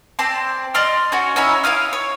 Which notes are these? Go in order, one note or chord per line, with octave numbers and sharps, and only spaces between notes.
C4 D5 A5 C6
D5 D#5 C6 F6
C#4 F#4
C#4 D#4 E4 C#5
E4 F5 D#6 F6
C#5